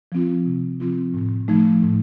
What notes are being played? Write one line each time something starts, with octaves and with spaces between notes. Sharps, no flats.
F3 C4 F4
C3
F3 C4 F4
A2
F3 A3 D#4
A2